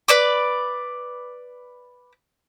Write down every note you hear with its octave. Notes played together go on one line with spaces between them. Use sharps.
B4 D5 D6